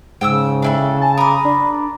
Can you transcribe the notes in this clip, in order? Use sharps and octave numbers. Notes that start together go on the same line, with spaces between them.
G#2 C#3 G5 D#6 E6
D4 E4 A4 G5
G#5 A5
A#4 B5 D6 D#6
D4